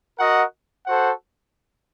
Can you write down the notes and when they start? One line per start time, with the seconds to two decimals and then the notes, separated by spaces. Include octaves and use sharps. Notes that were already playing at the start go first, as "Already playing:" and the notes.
0.19 F#4 A#4 D#5 F#5
0.87 F#4 A4 C5 F#5